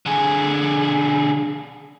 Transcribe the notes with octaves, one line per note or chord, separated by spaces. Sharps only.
D3 G#4